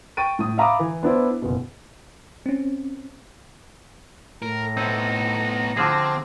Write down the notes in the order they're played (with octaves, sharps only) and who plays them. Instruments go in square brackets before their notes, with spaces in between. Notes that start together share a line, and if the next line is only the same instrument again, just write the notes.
[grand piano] G5 C#6 A6 D7 D#7
A2 D#6
E5 F5 A#5 B5 D6 D#6
E3
B3 D4 E4 C5
F#1 B2
[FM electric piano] C4 C#4
[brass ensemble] A2 [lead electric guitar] A#4 [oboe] A#5
[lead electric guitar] B3 D#4 [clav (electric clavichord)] C4 E4
[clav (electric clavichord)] D3 F3 G#4 [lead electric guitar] C4